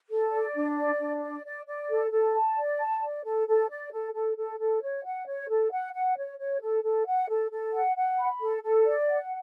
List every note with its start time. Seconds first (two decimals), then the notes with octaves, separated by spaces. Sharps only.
0.10 A4
0.32 D5
0.55 D4
0.77 D5
1.00 D4
1.22 D5
1.45 D5
1.67 D5
1.90 A4
2.11 A4
2.35 A5
2.57 D5
2.80 A5
3.02 D5
3.25 A4
3.47 A4
3.69 D5
3.92 A4
4.14 A4
4.36 A4
4.60 A4
4.81 C#5
5.04 F#5
5.26 C#5
5.49 A4
5.71 F#5
5.94 F#5
6.17 C#5
6.39 C#5
6.61 A4
6.83 A4
7.06 F#5
7.29 A4
7.51 A4
7.73 F#5
7.96 F#5
8.19 B5
8.40 A4
8.63 A4
8.85 D5
9.08 F#5